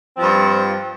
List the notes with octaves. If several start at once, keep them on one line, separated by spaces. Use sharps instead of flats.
G2 F3 C4